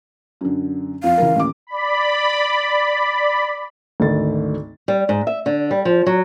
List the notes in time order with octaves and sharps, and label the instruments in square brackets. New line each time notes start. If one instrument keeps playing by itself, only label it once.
[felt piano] F#2 D3
[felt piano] F2 [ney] F5
[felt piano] C#2 E3 A#4
A1 D#2 D6
[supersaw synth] D5 B5
[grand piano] G#1 D2 A3 D5 A6
[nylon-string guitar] G3
G#2
E5
D3
G3
F3
F#3